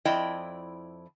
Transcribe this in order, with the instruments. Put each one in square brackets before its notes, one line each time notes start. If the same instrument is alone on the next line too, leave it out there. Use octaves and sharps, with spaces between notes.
[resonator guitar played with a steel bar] F2 E4 D5 D#5 G5